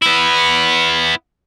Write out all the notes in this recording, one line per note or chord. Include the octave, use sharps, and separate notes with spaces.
B3 E4